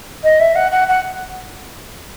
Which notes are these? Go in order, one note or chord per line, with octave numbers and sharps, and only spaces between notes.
D#5
E5
F#5
F#5
F#5